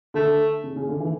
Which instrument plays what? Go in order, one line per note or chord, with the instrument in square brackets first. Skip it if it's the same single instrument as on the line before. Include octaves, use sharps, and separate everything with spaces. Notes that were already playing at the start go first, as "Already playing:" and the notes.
[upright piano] D3 [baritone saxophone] A3
[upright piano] C#3
C#3
D3
E3